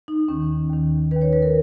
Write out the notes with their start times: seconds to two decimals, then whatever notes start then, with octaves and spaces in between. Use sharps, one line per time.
0.08 D#4
0.28 D#2 D#3 C#4
0.70 D#2 D#3
1.11 D#2 D#3 B4
1.22 C#5
1.33 B4
1.42 A#4